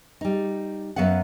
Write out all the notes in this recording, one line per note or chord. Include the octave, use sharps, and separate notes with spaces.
G3 D#4
F#2 F#3 B3 F5 F#5